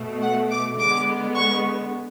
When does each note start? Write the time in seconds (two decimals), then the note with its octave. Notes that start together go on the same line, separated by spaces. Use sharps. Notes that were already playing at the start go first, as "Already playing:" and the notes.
Already playing: B2 A3
0.22 F#5
0.50 D6
0.78 D3 G#3 B3 D6
1.35 C#6